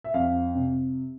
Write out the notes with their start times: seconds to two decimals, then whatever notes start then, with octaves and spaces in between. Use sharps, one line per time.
0.04 E5
0.14 F2 F5
0.55 C3